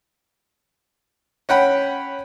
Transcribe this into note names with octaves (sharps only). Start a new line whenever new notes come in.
C#4 F#5 G5 B5